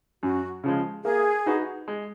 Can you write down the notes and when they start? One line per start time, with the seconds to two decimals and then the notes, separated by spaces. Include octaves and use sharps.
0.23 F#2 F#4
0.64 C#3 F3 G#3
1.04 A#3 G#4
1.46 D#4 F#4 B4
1.88 G#3